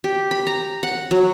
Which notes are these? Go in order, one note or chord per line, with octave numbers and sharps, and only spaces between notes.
G4
B5
A#5
F#5
F#3